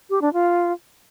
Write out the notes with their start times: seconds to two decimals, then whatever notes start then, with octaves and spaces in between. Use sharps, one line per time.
0.10 G4
0.22 D4
0.33 F4